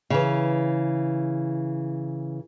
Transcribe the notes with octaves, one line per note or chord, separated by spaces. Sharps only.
C#3 E3